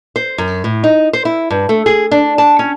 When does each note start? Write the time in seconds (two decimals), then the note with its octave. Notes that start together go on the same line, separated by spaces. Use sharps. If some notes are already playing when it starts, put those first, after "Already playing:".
0.16 C5
0.38 F#2
0.64 A2
0.84 D#4
1.13 C5
1.25 E4
1.50 G2
1.69 A3
1.86 G#4
2.12 D4
2.38 A5
2.59 C#4